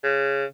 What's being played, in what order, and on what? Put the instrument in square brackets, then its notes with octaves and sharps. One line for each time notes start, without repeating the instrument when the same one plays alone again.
[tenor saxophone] C#3